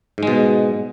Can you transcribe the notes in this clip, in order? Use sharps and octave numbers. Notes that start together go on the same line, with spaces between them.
G#2 B2 G#3